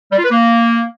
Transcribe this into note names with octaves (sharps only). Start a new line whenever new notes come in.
G3
F4
B4
A#3